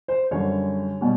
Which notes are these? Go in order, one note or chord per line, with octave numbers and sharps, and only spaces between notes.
C5
F#2 D3 G3 C#5
B2 G3